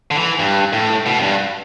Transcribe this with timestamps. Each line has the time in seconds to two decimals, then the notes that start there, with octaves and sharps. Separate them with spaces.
0.11 D3
0.16 E3
0.39 G2
0.73 A2
1.06 B2
1.19 F#2
1.22 G2